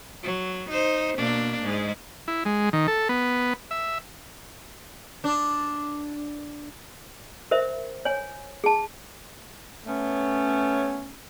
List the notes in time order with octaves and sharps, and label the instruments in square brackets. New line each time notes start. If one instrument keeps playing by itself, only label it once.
[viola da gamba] F#3
D#4 C5
B2 A#3 D4
G#2 G#3
[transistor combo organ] E4
G#3
D#3
A4
B3
E5
[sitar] D4
[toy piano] A#4 C5 E5
C#5 G#5
G#4 A5
[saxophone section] A3 B3 C#4